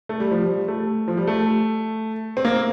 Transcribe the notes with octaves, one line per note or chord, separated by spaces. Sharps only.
A3
G3
F3
G3
A3
F3
G3
A3
C4
A#3